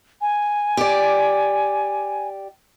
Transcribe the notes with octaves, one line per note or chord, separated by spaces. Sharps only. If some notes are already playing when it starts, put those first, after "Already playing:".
G#5
G4 D5